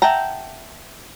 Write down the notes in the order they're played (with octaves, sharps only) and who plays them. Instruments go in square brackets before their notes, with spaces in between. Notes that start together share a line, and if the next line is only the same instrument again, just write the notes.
[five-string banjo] E5 F#5 G5 A5 A#5